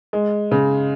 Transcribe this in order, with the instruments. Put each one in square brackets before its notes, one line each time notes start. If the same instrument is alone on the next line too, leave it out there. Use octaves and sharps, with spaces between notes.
[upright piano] G#3
C#3